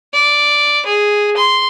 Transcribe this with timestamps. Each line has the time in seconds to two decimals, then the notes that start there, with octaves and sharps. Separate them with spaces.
0.13 D5
0.86 G#4
1.37 C6